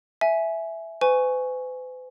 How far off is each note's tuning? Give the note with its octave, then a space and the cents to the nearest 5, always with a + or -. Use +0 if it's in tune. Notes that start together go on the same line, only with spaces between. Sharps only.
E5 +0 G#5 +15
B4 +45 G#5 +0 C#6 +0